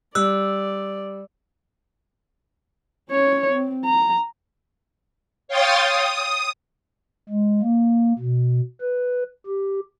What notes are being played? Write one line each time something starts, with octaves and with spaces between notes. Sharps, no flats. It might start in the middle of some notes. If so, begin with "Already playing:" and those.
G3 D5 E6 F#6
C#4 C#5
C4
A#5
C#5 F5 G5 C6 D#6 A6
D#6
G#3
A#3
B2
B4
G4